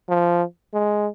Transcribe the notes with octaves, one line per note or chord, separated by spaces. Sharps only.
F3
G#3